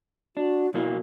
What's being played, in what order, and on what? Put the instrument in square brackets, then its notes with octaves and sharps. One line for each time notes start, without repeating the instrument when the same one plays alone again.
[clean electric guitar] D4 [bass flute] F#4
[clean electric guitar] B1 F#3 A#3 [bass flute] E4